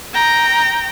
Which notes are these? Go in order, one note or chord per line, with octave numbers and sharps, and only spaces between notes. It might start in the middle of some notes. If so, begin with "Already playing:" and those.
G5 A#5